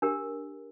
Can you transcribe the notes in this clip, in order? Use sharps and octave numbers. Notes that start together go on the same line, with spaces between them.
D4 G4 A#4